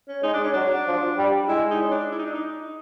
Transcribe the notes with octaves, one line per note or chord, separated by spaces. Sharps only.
C#4
G#3 D#4
D4
C#4
F#3 D4
F3
G3
G#3 E4
D#4
C#4
D4
E4
D#4
D4
D#4